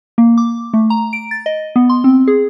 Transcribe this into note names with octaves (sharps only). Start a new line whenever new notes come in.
A#3
D6
A3
A#5
D7
A6
D#5
B3
C6
C4
G#4